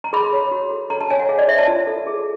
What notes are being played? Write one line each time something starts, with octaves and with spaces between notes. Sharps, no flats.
A#5
G#4 B5
C#5
F#4
A4
A4 A#5
A5
C#5 G#5
F#5
G#4 F5
D5
C5 E5
A5
F4
A4
G#4